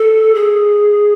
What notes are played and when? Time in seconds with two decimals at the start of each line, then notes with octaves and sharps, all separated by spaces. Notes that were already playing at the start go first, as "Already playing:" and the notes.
Already playing: A4
0.35 G#4